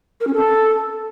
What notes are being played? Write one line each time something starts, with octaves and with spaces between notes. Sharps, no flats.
A#4
C#4
A4